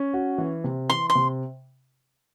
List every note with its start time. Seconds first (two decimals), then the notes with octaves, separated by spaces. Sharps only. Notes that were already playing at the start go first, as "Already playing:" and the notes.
Already playing: C#4
0.14 F#4
0.38 E3
0.64 C3
0.90 E3 C6
1.10 C6
1.15 C3